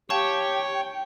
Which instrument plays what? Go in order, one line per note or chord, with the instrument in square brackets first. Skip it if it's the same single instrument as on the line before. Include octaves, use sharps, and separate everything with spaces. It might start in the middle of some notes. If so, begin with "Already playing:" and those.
[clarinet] G4 [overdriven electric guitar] C#5 [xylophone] F5 A5 C#6 [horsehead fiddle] G5